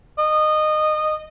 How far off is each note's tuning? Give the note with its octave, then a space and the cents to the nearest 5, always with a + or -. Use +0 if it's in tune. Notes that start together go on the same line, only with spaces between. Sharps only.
D#5 -20